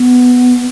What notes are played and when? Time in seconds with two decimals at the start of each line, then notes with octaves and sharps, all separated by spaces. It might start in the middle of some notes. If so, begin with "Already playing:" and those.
Already playing: B3